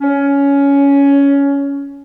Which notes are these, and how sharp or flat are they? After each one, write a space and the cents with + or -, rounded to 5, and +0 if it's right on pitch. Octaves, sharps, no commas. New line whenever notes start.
C#4 +15